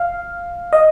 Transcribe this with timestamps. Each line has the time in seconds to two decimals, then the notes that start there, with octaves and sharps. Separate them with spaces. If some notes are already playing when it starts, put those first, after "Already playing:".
Already playing: F5
0.73 D#5